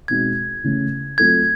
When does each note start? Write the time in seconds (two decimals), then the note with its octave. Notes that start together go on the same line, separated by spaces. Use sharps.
0.08 B2 G#3 C4 D#4 F#4 G#6
0.63 C#3 E3 A3 C#4
1.18 F#3 A3 C4 F4 A4 G#6